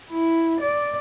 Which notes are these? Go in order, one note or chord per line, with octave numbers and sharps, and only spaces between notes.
E4
D5